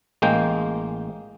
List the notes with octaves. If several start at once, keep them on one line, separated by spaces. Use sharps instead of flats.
A1 G#3 A#3 G5